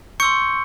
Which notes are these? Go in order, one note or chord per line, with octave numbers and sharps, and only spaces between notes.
C6 C#6 E6 G6 C#7